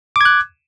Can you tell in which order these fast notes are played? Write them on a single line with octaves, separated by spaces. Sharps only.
D6 G#6 F#6